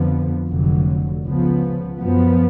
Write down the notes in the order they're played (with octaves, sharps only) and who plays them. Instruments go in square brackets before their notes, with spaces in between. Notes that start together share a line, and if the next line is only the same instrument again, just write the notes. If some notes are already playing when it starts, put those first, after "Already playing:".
Already playing: [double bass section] F2 D3 F3 B3
F1 F2 D3 F#3
C#2 C#3 F3 B3
F#2 F3 B3